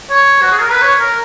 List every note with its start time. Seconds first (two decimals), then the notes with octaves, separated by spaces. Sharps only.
0.10 C#5
0.42 F#4
0.52 G#4
0.61 A#4
0.72 B4
0.82 C#5
0.99 A#4